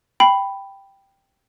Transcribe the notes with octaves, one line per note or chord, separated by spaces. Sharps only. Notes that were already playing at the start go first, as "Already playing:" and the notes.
G5 B5 C7